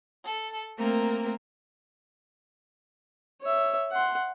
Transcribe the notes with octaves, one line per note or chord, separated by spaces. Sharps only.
A4
A3 A#3 C4 A#4
C#5 E5
F#5 C6